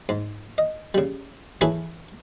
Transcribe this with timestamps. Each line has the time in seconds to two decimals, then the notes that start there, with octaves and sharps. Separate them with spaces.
0.09 G#2
0.58 D#5
0.94 C#3 G3
1.61 E3 E4 G#4 A4 C#5